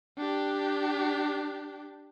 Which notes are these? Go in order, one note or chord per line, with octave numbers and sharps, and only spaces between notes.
D4 G4